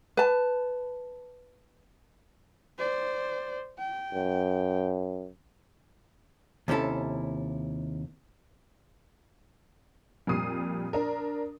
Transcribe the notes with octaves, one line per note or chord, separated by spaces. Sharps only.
B4 A5
C5 D5
G5
F#2
D#2 C3 C#4 E4 A4
F2 A#2 G3 D#6 C7
D4 A#4